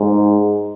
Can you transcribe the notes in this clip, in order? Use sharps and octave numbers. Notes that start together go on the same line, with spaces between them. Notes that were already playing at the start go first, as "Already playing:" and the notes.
Already playing: G#2